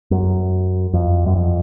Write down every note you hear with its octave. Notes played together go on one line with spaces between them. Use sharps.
F#2
F2
F#2
F2